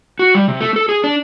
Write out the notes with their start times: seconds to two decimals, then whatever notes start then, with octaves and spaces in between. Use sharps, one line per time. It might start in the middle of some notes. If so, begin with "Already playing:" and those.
0.19 F#4
0.35 G3
0.48 C3
0.61 A3
0.76 A4
0.89 G#4
1.04 D4